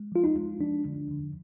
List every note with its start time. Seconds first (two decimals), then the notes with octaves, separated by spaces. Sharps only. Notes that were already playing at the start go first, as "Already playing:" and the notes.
Already playing: G#3
0.12 F3 F4
0.24 D#4
0.36 G#3
0.61 F3 D4
0.85 D3
1.11 D3